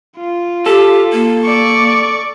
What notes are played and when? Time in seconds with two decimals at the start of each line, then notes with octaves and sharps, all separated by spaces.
0.17 F4
0.66 G4 A4
1.12 A#3
1.44 D5 C#6